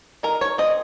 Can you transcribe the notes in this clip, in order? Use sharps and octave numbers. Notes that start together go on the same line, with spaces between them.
D#4 A#4
C#5
C4 D#5